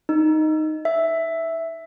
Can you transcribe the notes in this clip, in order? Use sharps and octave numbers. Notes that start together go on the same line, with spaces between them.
D#4
E5